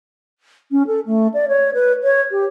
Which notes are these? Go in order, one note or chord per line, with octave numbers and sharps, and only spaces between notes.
C#4
A4
A3
D5
C#5
B4
C#5
G4